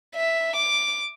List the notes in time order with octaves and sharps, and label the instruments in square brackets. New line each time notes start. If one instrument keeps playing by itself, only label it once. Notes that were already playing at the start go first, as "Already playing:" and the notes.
[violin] E5
D6